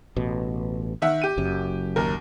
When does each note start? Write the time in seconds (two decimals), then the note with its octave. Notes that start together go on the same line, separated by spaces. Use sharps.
0.16 A1 B2
1.02 D#3 E5 F#5
1.22 G4 D#7
1.38 F#1 F#2
1.96 D#2 A#4